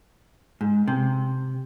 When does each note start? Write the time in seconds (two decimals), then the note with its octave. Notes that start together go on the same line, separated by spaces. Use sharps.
0.61 G#2
0.88 C3